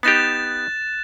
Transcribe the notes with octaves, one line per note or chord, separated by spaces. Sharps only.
B3 D#4 G4 F#6 A6 E7